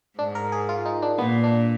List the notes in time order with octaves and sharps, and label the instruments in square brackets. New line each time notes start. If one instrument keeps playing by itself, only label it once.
[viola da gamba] G#2 [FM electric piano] D4
[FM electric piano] A#4
G#4
F4
D#4
D4
[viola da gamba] A#2 [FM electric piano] B3
[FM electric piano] D4